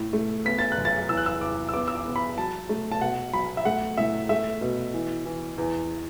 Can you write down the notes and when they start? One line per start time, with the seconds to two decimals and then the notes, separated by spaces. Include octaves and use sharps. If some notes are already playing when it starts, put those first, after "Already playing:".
Already playing: A2
0.13 A3
0.45 B3 B6
0.59 A6
0.72 F#6
0.78 F#2
0.85 A6
1.09 E2 E6
1.17 F#6
1.26 E6
1.41 E2 D6
1.69 E6
1.73 B3 D6
1.88 E6
1.95 D6
2.05 B3
2.16 B5
2.38 F#3 A5
2.69 A3
2.92 A5
3.01 B2 F#5
3.33 F#3 B5
3.57 E5
3.65 A3 F#5
3.98 A2 E5
4.29 A3 E5
4.61 B2
4.94 E3
5.25 E3
5.58 E2